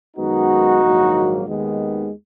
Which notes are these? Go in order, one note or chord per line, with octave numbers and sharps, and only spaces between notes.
F#2 D#3 G#3 B3 D#4 F#4
A#1 G#2 D#3 F#3 A#3
D#2 D#3 G#3 B3